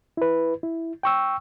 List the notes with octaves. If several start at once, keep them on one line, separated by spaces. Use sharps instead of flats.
E4 B4
E4
G5 C#6 E6